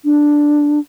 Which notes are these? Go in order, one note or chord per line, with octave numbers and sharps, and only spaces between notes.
D4